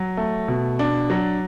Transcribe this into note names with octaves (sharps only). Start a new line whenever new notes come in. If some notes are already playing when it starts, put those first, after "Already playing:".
Already playing: F#3
A3
B2
D4
F#3